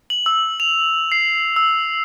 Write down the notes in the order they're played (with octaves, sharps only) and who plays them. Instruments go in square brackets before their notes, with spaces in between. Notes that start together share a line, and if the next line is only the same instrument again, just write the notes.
[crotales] F#7
E6
F7
C7
E6